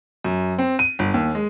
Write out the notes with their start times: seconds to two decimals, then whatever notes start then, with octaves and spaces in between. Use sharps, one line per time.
0.25 F#2
0.59 C4
0.79 D#7
0.99 G1
1.14 D#2
1.35 G#3